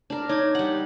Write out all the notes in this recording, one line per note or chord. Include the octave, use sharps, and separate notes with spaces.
D4 A#4
D#4 C#5 D6 G#6
G3 F#5